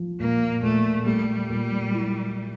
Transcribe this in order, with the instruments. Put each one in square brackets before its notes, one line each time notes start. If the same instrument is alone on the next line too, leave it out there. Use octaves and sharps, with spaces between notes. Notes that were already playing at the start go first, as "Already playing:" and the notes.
Already playing: [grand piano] F3
[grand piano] A#2 [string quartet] A#3
[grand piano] A#2 [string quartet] A3
[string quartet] G3 [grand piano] A3
[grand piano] A#2
E4